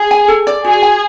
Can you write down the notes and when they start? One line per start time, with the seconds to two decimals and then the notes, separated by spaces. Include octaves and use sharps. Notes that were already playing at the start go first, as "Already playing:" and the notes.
Already playing: G#4
0.11 G#5
0.28 A4
0.47 D5
0.64 F#4 G#4
0.82 G#5